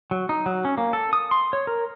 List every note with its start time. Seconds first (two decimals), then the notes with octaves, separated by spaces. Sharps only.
0.11 F#3
0.29 D#4
0.46 F#3
0.65 C#4
0.78 A#3
0.93 A4
1.13 D#6
1.31 C6
1.53 C#5
1.67 A#4